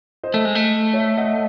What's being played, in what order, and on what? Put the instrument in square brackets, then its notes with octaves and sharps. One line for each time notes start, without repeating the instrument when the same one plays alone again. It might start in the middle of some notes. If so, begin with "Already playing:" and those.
[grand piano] C5 D#5
[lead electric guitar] A3
G#3
A3
[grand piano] C#5 E5
D#5 F#5